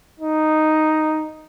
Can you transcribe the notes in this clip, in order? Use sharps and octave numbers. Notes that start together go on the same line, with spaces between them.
D#4